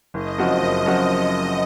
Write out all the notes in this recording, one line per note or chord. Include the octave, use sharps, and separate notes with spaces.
F#1 D#5
F#2 F3 C4 F#4
F#1
F#2 F3 C4 F#4